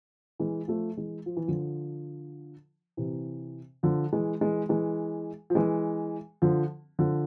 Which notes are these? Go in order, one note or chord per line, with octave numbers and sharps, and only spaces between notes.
E3 G#3
F3 A3
E3 G#3
F3
E3
D3 F3
C3 E3
D3 F3
E3 G#3
E3 G#3
E3 G#3
F3
E3 G#3
D3 F3
D3 F3